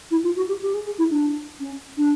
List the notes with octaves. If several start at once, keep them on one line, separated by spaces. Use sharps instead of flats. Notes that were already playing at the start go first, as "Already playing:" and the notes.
E4
F4
F#4
G4
G4
G#4
G#4
E4
D4
C#4
D4